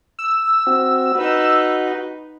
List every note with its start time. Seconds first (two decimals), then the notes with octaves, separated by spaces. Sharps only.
0.19 E6
0.67 C4 F#4
1.15 D#4 F#4 B4